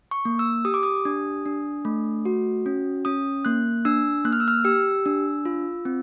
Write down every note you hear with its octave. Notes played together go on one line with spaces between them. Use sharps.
C#6
A#3
E6
G4 D#6
D6
D#6
D4
D4
A3
F#4
C#4
C#4 D#6
A#3 F#6
D4 E6
A#3 F#6
F6
E6
F6
G4 E6
D4
F4
C4